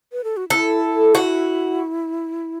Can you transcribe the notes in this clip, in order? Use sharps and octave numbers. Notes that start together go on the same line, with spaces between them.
B4
A4
F#4
E4 A4
F#4